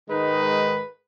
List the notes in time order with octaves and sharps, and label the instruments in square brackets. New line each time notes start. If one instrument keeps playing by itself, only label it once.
[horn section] G#2 D#3 G#3 D#4 B4